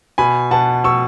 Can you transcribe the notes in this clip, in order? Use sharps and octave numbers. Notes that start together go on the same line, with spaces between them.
B2 G#5 B5
B2 F#5 A5
B2 C#6 E6